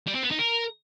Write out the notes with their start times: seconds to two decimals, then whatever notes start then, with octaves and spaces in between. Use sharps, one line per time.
0.07 G3
0.15 C4
0.23 B3
0.31 D#4
0.39 A#4